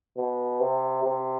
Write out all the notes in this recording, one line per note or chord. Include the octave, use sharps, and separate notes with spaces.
B2
C3
C3